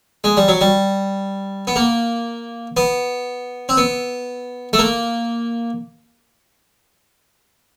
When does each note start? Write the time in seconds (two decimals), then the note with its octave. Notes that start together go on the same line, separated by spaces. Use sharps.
0.24 G#3
0.37 G3
0.48 F#3
0.61 G3
1.67 B3
1.76 A#3
2.77 B3
3.69 C4
3.77 B3
4.73 A3
4.79 A#3